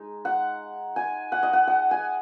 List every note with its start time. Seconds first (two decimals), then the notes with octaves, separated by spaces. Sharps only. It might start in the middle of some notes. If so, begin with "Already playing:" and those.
Already playing: G#3 D#4
0.25 F#5
0.96 G#5
1.32 F#5
1.43 D#5
1.53 F#5
1.67 F#5
1.91 G#5